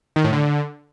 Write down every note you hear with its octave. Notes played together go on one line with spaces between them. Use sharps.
D#3
A2
D3